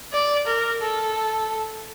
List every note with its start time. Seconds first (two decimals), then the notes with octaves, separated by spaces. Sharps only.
0.13 D5
0.47 A#4
0.82 A4